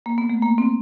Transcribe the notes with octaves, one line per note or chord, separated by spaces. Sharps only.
A#3
B3
A3
A#3
C4